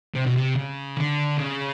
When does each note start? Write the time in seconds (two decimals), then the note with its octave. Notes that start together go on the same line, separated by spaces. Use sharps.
0.15 C3
0.26 B2
0.36 C3
0.56 C#3
0.96 D3
1.37 C#3